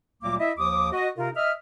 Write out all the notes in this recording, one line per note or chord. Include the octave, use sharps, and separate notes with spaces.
D2 A#2 F#3 G3 A#3 D6
E4 D#5 E5
D#2 F3 D6 D#6
F#4 D#5
C3 D#4 F4 A#4
D#5 E5 F6